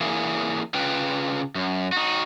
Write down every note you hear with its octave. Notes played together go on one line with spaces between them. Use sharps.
E3 A#3 E4 G#4
C#3 F4 B4 G5
F#2
D#4 F#4